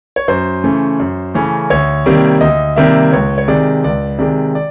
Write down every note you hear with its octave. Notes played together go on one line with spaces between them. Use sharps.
C#5
F#2 C5
C#3 E3 A3 C#4
F#2
C#3 E3 A3 C#4
D2 C#5
C3 D#3 G3 A#3
D2 D#5
C3 D#3 G3 A#3 E5
C#2 C#5
C#5
C3 D#3 G#3 D5
C#2 D5
C3 D#3 G#3 D5
D5